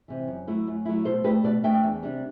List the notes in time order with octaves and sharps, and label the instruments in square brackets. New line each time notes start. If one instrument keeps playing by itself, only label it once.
[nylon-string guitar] C3 E3
F#2
F#3 A3 E4
F#2
F#3 A3 E4
B2 A4 C5
A3 D4 G4 B4
B2 B4 D5
A3 D4 E5 G5
E2
C3 G3 D4